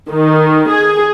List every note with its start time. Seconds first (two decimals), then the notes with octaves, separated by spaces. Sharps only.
0.10 D#3
0.69 G#4